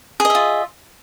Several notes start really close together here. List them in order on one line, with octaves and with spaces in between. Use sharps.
G#4 D#5 E5 F4